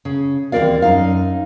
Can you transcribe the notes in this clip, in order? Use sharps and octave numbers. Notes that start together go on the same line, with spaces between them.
C#3
D#2 E3 C4 A#4 D5 F5
F#2 D#4 F5